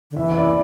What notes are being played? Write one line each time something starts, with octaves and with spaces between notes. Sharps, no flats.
D3
E3 E5
E5
D5